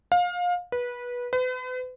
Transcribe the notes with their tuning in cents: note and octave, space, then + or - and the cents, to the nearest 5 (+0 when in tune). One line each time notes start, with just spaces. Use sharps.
F5 +25
B4 -20
B4 +40